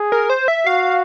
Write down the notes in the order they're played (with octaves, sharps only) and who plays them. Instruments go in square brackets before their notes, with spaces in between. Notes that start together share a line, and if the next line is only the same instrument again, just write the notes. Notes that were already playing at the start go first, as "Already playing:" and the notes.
Already playing: [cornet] G#4
[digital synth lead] A#4
C5
E5
[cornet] F#4 [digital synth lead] F5